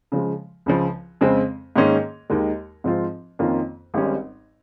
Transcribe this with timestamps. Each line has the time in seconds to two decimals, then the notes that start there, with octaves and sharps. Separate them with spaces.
0.12 C#3 F3 G#3
0.66 C#2 C#3 F3
1.21 F2 C#3 G#3 C4
1.76 G#2 D#3 A#3 C#4 G#4
2.30 D#2 D#3 G#3
2.84 G#2 F3 C4 F4
3.39 F2 D#3 A#3 C#4 F4
3.94 G#1 G#2 G3 C#4